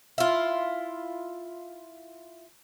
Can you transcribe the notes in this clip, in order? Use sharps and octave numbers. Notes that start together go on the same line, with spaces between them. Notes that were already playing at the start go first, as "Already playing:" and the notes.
E4 F4